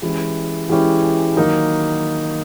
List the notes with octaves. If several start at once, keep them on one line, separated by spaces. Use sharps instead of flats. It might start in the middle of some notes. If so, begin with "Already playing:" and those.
E3 G#3 C#4 E4 G4
E3 G#3 C#4 E4 G4
D#3 F#3 A#3 D#4